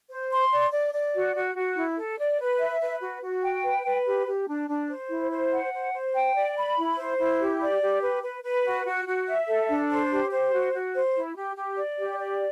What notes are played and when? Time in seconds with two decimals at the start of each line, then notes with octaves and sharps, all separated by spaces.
0.09 C5
0.31 C6
0.52 D5
0.72 D5
0.93 D5
1.14 F#4
1.34 F#4
1.56 F#4
1.76 E4
1.97 A4
2.18 D5
2.39 B4
2.59 E5
2.80 B4
3.01 F#4
3.22 F#4
3.44 G5
3.64 B4
3.85 B4
4.06 G4
4.27 G4
4.47 D4
4.69 D4
4.89 C5
5.10 E4
5.31 C5
5.52 F#5
5.73 C5
5.93 C5
6.14 G5
6.35 D5
6.56 B5
6.77 E4
6.98 C5
7.19 E4
7.39 G4
7.60 D5
7.80 G4
8.02 B4
8.23 B4
8.43 B4
8.64 F#4
8.85 F#4
9.06 F#4
9.27 E5
9.47 A4
9.68 D4
9.89 C5
10.10 G4
10.31 C5
10.51 F#4
10.73 F#4
10.94 C5
11.15 E4
11.36 G4
11.56 G4
11.78 D5
11.98 G4
12.19 D5